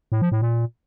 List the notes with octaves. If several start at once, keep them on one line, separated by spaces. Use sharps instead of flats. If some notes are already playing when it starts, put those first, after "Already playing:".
A2
F3
A2
A#2